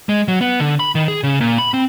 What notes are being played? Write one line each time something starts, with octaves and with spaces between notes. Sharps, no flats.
G#3
F#3
B3
D3
B5
D#3
G#4
C#3
A#2
B5
C4